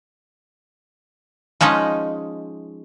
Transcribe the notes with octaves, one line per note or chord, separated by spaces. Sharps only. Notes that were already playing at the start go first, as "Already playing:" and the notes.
F3 G#3 C#4 D#4 D#5